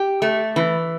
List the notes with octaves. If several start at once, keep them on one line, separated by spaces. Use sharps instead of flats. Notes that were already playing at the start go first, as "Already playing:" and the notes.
Already playing: G4
A3
E3